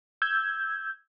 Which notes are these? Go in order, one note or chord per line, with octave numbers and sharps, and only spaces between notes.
E6 G6 G#6